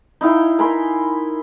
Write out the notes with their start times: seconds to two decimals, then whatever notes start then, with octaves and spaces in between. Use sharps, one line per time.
0.21 D#4 E4 F5 G5
0.59 A#4 G#5 B5 C6